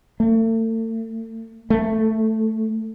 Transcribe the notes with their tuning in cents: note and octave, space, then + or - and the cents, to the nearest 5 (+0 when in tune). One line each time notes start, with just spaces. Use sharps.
A3 +40
A3 +5